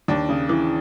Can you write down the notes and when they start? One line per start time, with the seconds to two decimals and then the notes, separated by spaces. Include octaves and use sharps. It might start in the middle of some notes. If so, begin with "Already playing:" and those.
0.08 D#2 D4
0.29 C#3
0.49 E3